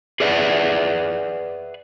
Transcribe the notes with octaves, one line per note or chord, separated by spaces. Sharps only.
G#4 B4 D5 E5 F#5